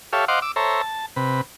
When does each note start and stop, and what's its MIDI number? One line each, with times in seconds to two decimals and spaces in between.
0.13 0.25 67
0.13 0.25 69
0.13 0.25 73
0.13 0.25 76
0.13 0.25 77
0.28 0.40 72
0.28 0.40 75
0.28 0.40 77
0.28 0.40 78
0.28 0.40 84
0.28 0.40 86
0.42 0.52 86
0.42 0.52 88
0.56 0.82 69
0.56 0.82 72
0.56 0.82 73
0.56 0.82 76
0.56 0.82 82
0.82 1.06 81
1.16 1.41 48
1.16 1.41 71